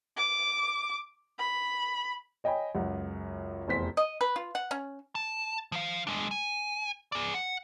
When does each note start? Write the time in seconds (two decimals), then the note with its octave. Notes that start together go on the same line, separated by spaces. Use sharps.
0.17 D6
1.39 B5
2.44 C#5 D#5 G5 G#5 B5
2.75 C#2 F#2 F#5
3.68 F1 E2 C5 B6
3.97 D#5
4.21 B4
4.36 F4
4.55 F#5
4.71 C#4
5.15 A5
5.72 F3 F5
6.07 G#3 D4
6.31 G#5
7.12 G#4 D5
7.34 F#5